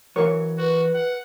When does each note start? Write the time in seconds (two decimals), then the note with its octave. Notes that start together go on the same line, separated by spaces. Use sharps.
0.16 E3 F#3 A#4 C#5 C#6
0.58 F#4 B4
0.94 F#5